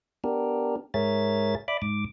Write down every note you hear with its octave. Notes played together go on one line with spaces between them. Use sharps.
B3 D4 G4 A#4
G#2 G#4 A#4 C#5 E5 A6
D5 E5 B5 D6
G#2 D6